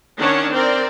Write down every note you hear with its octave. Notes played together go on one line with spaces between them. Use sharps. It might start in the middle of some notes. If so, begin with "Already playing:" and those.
D#3 C#4 D4 C#5 F#5
C4 A#4 D5